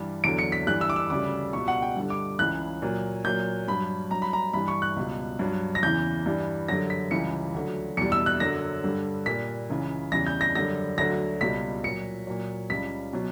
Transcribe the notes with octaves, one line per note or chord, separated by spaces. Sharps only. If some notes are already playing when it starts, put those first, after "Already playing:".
Already playing: G2 E3 G3
E2 D3 F#3 D7
C#7
B6
G2 E3 G3 F#6
E6
D6
E6
D2 C#3 G3 D6
C#2 B2 G3 C#6
F#5
G5
G2 D3 G3
D6
C#2 C#3 E3 F#6
A#2 F#3
A#2 F#3 G6
G2 F#3 B5
G2 F#3 A#5
B5
A#5
G2 E3 G3 B5
C#6
F#6
C#2 B2 G3
G2 F#3
A#6
E2 C#3 E3 G6
G2 E3 G3
F#2 D3 G3 A#6
B6
C#2 C#3 E3 G3 C#7
D2 D3 F#3
E2 B2 G3 C#7
E6
F#6
F#2 D3 F#3 A#6
G2 D3 G3
A#2 G3 B6
C#2 C#3 E3
E2 C#3 E3 G3 A#6
G6
A#6
F#2 D3 G3 A#6
D2 D3 F#3 A#6
C#2 B2 G3 B6
A#2 F#3 C#7
A#2 F#3
C#2 C#3 G3 B6
B2 F#3